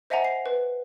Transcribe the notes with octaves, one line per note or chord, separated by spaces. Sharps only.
C5 D#5 E5 F#5 G#5 A#5
C7
B4